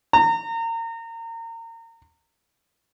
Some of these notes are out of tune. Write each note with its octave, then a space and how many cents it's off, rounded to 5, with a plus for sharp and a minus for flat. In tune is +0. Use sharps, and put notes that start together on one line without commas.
A#5 -30